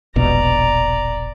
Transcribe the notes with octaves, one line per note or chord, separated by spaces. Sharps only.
E1 A#1 B2 D5 A#5